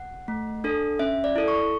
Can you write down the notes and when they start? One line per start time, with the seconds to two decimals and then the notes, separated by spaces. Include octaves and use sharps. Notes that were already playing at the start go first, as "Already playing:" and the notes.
Already playing: F#5
0.28 A3
0.64 D4 A4
0.99 C#4 E5
1.24 D5
1.36 E4 A4
1.48 C#6